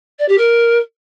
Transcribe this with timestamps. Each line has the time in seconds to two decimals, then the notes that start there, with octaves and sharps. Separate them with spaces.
0.18 D5
0.28 G4
0.37 A#4